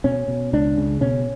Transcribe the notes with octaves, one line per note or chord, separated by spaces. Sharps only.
B2 C#4
B2
C#2 D4
C#3
B2 C#4